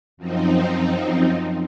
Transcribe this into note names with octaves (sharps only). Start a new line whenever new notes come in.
F#2 F3 C4 D#4